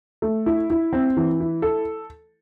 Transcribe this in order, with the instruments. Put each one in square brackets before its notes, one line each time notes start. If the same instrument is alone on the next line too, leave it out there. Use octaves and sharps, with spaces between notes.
[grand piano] A3
E4
E4
C4
E3
E4
A4